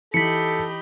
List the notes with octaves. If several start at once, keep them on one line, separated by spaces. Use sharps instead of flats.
E3 D#4 G4 A4 B5 B6 C#7